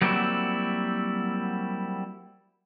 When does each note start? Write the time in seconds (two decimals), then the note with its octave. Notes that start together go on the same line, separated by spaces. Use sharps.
0.02 F#3 G3 A#3 C4 E4 F#4